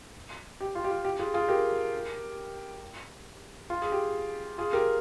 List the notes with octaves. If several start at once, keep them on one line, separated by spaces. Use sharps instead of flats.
G4
F4
G4
F4
G4
F4 G#4
F4 G#4
G4 A#4
F4
G#4
G4
F4 G#4
G4 A#4